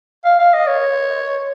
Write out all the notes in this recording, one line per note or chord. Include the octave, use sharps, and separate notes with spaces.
F5
F5
D#5
C#5